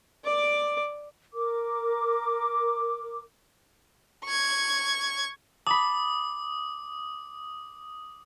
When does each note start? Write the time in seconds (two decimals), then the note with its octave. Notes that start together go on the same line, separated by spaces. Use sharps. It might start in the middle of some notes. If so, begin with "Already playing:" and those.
0.24 D5 D6
1.33 A#4 D6
4.25 C#6 G#6
5.67 A5 B5 D6 D#6 F#7